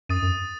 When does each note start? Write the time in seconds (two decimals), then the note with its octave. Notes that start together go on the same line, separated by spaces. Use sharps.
0.09 F#2 D#6 A6 D#7
0.22 F#2